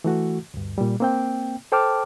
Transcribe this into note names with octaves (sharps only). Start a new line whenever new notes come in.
E3 A3 F#4
D2 G2
A#2 G3
A#3 C4 G5
A4 C5 G5 A5 D6 F6